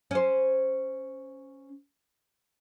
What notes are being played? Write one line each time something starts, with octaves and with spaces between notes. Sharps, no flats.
C#4 C5